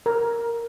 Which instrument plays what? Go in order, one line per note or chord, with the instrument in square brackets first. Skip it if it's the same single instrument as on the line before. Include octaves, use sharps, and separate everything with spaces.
[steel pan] A#4